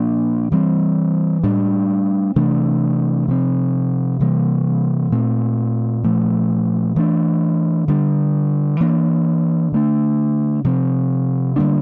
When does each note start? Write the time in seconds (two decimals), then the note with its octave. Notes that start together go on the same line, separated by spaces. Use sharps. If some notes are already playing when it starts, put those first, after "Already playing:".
Already playing: A#2 F3 A#3 D4
0.52 E3 G3 C4
1.43 A2 G3 D4
2.36 C3 E3 A3 D4
3.28 C3 F3 C4
4.20 C3 E3 G3 A#3
5.12 A#2 A3 C4
6.04 A#2 F3 A3
6.96 E3 A3 D4
7.88 D3 G3 D4
8.80 E3 A#3 D4
9.72 D3 A3 D4
10.64 C3 F3 C4
11.56 D3 G3 A#3 D4